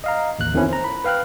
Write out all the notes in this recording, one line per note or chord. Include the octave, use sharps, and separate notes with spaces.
D#5 F5 A#5
A1 D#2 F#6
F2 D#3 F3 B3 C#4 E4
C5 A#5
B5
B4 F5 G5 F6 F#6